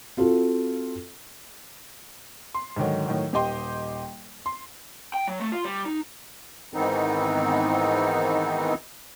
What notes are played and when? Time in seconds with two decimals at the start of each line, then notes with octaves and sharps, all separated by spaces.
0.17 C4 F4 F#4 A4
2.54 C6
2.76 G#2 D3 D#3 F#3
3.06 A2 D#3 F#3
3.33 D#1 G4 D#5 G5 C6
4.46 C6
5.14 G5
5.27 F#3
5.40 A3
5.52 F4
5.64 G3
5.85 D#4
6.74 G#2 D#3 E3 B3 C4 D#4